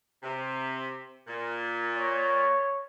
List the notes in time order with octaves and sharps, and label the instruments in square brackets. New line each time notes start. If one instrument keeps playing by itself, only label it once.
[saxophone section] C3
A#2
[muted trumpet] C#5